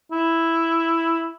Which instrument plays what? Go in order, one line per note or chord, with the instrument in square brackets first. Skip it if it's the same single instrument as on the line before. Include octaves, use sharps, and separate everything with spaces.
[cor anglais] E4